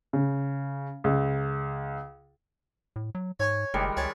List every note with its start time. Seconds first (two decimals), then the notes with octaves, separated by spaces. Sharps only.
0.13 C#3
1.04 C#2
2.96 A2
3.15 F#3
3.40 G#2 C#5 G#5 C#6
3.74 F#1 D#3 G3 G#3
3.97 C#2 G#4 C#5 A5